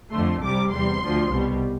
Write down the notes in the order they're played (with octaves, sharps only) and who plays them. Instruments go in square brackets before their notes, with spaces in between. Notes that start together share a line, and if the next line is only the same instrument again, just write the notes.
[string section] F2 D3 A3 C6
C2 C3 G3 D6
E2 C3 G3 C6
D2 D3 F3
C2 B2 G3